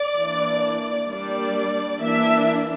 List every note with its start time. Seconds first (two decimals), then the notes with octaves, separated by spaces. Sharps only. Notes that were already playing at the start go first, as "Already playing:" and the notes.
Already playing: D5
0.19 E3 A#3 D4
1.10 G3 A#3 D4 D5
2.01 E3 A#3 D4 E5